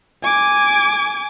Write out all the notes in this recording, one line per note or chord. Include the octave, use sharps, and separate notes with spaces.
G#5 D6